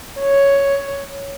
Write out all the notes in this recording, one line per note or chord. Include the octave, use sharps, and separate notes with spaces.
C#5